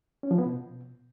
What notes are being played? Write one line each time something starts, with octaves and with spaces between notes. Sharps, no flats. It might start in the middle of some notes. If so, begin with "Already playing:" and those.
C#4
F3
B3
B2